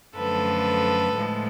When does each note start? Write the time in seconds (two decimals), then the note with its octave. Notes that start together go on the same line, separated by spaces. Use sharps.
0.15 F#2 D3 F3 A3 A4 B4
1.15 A2 F3 G#3